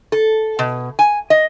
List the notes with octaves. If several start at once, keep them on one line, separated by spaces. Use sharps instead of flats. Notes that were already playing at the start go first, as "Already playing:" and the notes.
A4
B2
G#5
D#5